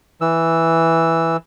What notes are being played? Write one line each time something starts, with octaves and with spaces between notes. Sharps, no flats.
E3 E6